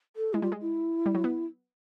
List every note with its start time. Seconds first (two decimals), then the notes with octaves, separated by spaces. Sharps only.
0.16 A4
0.34 G#3 E4
0.42 G3 F4
0.52 G#3
0.62 E4
1.06 G3
1.15 F#3
1.24 B3